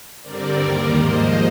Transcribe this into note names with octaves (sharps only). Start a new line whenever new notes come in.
G2 D3 G3 C4 A#4 D5
D#2 D#3 G3 A#3
G#2 F3 A#3 C5 D#5